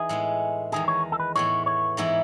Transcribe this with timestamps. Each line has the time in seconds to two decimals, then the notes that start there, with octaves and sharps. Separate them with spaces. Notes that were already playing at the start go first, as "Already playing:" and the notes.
Already playing: E3 D#4 G#4
0.09 A2 G#3 B3
0.72 E2 D#3 G#3 G#4
0.88 C#5
1.12 A4
1.20 B4
1.35 A2 E3 B3 C#5
1.66 C#5
1.97 G#2 E3 B3 E4